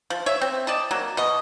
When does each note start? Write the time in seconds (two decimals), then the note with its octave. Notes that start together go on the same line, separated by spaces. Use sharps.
0.10 F3
0.26 C#5 E5
0.41 C4
0.67 D5 D#5 A5
0.91 F#3 A#3
1.17 B2 D#5